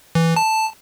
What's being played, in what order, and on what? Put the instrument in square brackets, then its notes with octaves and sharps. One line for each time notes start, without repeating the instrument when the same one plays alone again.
[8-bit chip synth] E3
A5